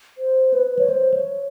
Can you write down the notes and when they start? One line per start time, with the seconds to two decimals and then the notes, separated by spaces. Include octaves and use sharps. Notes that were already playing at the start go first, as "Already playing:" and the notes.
0.18 C5
0.54 B4
0.79 C#5
0.90 C5
1.14 C#5